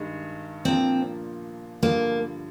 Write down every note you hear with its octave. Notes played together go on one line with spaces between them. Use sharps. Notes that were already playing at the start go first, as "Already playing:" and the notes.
Already playing: G2 D#3 G#3
A#2 F3 A#3 C4 D4
G2 D3 F3 A#3